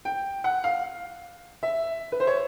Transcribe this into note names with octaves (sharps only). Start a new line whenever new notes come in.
G5
F#5
F5
E5
B4
C5
C#5